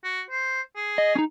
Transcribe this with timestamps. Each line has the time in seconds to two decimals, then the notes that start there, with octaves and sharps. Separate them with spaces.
0.04 F#4
0.30 C5
0.76 G#4
0.98 D#5
1.15 C#4 D#4